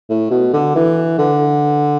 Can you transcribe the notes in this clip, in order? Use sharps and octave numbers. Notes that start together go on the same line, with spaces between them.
A2
B2
D3
E3
D3